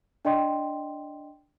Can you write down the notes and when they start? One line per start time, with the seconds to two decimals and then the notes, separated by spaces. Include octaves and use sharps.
0.25 D4 D5 D#5 G5 C6